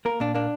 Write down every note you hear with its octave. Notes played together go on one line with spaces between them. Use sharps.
A#3 A#4
A#2 D4
A#3 D4